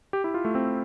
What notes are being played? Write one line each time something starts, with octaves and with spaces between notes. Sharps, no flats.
G4
E4
F4
A3
C4